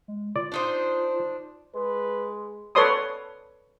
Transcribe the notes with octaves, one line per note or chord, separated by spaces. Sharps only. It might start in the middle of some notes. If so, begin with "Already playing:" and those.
G#3
F4 D5
D4 D#4 C5
G#3 B4
A4 B4 C#5 D5 C6 D#6